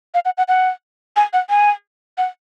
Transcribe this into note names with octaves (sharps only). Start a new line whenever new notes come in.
F5
F#5
F#5
F#5
G#5
F#5
G#5
F#5